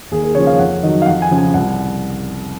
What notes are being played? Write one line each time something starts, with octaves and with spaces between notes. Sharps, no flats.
D#2 G#4
A#4
C#3 F3 C#5
F5
F2 F#5
D#3 F#3 D#5
F5
F2 F#5
G#5
C#3 F3
G#5
C2 F#5